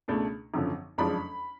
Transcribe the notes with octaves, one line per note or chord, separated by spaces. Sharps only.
C#2 B2 A3 D4
G#1 F#2 D3 F3
F#1 F2 F3 G#3 D4 B5